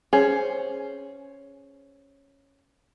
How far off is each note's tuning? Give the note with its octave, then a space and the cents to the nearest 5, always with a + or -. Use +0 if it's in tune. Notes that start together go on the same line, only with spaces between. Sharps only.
C#4 +0 G#4 +5 C5 +0